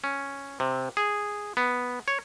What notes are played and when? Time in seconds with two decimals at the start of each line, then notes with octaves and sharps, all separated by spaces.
0.04 C#4
0.60 C3
0.97 G#4
1.57 B3
2.08 C#5